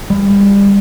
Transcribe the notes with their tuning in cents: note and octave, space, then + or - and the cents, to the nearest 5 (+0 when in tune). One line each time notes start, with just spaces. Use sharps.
G3 +35